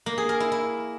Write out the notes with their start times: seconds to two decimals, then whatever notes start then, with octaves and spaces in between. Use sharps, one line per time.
0.06 A#3
0.18 G#4
0.29 A#4
0.40 E4
0.52 E4